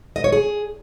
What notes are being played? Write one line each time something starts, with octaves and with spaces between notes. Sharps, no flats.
D#5
C#5
G#4